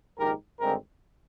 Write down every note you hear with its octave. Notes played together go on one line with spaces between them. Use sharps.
A#1 G#2 D#3 G4 A#4
G#1 G2 D3 G#3 C4 G4 A#4